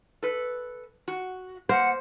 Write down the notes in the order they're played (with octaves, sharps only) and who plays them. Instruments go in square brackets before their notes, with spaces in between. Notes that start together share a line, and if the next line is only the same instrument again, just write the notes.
[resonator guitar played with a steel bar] A4 B4
F#4
[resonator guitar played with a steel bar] A#3 [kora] C5 [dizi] F#5